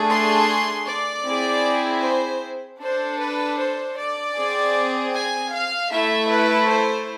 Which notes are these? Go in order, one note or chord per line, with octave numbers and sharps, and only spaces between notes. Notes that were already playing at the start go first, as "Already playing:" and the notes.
Already playing: A3 D4 G#4
C6
D5
C4 E4 G#4
C5
D4 A4 C5
B4
C5
D5
C4 G#4
G#5
F5
A3 E4 A4 E5
B4
C5